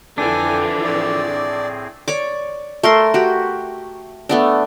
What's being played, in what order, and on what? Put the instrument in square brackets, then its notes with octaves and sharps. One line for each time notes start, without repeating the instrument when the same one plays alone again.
[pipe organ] F2 A4 G5 [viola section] D3 E3 F3 [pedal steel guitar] D4 [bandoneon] G#5
[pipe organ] A2 C4 G#4 [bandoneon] D5
[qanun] C#5 D5 D6
A3 A#4 C6
F#4 G4
A3 B3 D4